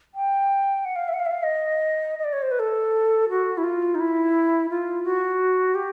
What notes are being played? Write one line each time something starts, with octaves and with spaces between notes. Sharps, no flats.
G5
F#5
F5
E5
F#5
F5
E5
F5
D#5
D#5
D5
C#5
C5
B4
A4
F#4
E4
F4
D#4
E4
F4
F#4
G4